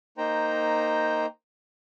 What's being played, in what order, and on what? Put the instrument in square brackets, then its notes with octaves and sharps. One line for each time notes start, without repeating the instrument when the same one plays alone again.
[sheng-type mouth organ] A#3 D#4 C5 G5 A#5